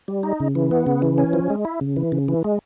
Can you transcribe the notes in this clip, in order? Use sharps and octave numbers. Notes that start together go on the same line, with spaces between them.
G3
D#4
C#3
E3
B3
C#3
E3
C#4
F3
G#3
E4
C#3
E3
C#3
E3
G#3